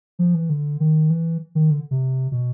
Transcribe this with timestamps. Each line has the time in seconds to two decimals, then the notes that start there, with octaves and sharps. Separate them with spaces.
0.19 F3
0.34 E3
0.49 D3
0.80 D#3
1.10 E3
1.55 D#3
1.70 D3
1.91 C3
2.32 B2